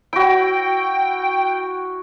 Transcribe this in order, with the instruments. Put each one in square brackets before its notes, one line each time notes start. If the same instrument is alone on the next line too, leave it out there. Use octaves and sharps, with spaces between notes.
[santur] E4 F#4 [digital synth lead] G5